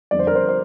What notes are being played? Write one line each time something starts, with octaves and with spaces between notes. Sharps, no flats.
F2 D3 G3 D5
C5
A#4
C5
C5